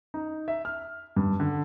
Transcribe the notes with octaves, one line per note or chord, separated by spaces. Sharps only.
D#4
E5
F6
G2
D3